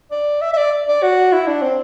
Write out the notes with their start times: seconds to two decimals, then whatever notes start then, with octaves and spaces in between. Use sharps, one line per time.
0.11 D5
0.41 E5
0.53 E5
0.57 D5
0.88 D5
1.03 F#4
1.32 E4
1.47 D4
1.62 C4